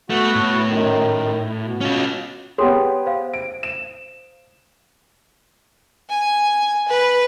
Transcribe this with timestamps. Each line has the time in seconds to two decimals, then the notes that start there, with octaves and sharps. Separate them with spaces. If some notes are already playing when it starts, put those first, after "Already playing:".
0.10 A3 B3 F#4 F#5
0.35 A2
0.67 F#2 D#3
1.64 B2
1.81 C#4 F4
2.58 B3 G4 G#4 C#5 C6 D#6
3.06 C5 F5
3.34 D7
3.63 E7
6.09 G#5
6.88 B4